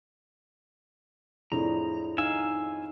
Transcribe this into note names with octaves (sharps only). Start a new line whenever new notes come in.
F2 A2 D4 G#4 A#5
D#4 F5 G#5 E6